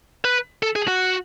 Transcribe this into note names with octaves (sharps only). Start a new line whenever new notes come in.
B4
A4
G#4
F#4